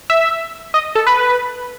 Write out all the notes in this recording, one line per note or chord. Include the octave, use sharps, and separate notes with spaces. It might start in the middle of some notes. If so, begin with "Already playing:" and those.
E5
D#5
A4
B4